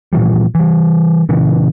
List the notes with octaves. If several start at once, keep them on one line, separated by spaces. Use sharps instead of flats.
A#2 E3 F3 G3
E3 G3
A#2 C#3 E3